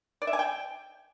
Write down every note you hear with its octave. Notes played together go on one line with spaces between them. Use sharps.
D5
E5
G#5
G5